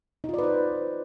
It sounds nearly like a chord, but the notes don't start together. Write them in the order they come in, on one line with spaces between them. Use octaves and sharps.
D#4 F4 D5 B4 C5